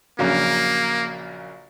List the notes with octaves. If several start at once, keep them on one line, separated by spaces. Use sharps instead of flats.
A#1 C#3 F#3 A#3